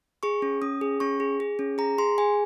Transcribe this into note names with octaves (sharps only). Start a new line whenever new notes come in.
G#4 C#6
C#4
C#4 D#6
G#4
C#4 C#6
G#4
G#4
C#4
G#4 A#5
G#4 C6
G#4 G#5